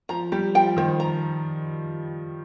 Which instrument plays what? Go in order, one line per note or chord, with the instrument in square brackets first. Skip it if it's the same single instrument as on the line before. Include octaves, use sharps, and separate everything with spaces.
[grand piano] F3 [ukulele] A#5
[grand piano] G3 [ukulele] G4
[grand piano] F3 [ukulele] G5
[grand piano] D#3 [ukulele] C5
[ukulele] A#5